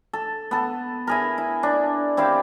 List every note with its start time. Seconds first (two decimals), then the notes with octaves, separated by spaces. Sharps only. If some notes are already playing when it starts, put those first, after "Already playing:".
0.13 A4
0.51 B3 A4
1.07 E4 G#4 A#4
1.38 E4
1.63 D4
2.17 C4 E4 G4 F5